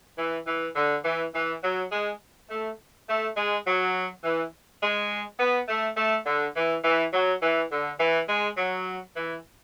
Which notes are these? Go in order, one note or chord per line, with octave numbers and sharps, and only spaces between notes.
E3
E3
D3
E3
E3
F#3
G#3
A3
A3
G#3
F#3
E3
G#3
B3
A3
A3
D3
E3
E3
F#3
E3
D3
E3
G#3
F#3
E3